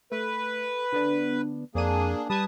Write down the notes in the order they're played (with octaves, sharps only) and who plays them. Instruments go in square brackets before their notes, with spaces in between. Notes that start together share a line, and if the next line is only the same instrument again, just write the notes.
[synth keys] A3 [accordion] B4
[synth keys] D3 B3 D4
[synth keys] F2 D#7 [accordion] A#3 D4 G#4
[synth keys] G3 G#6 [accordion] B4 A5 D#6